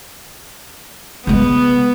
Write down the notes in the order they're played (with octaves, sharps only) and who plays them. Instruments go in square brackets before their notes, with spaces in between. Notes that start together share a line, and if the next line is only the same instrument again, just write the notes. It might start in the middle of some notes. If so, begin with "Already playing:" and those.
[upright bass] C#3 G#3 [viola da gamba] B3